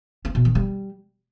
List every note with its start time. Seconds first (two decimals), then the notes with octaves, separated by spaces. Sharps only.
0.25 C4
0.35 B2
0.45 D#3
0.55 G3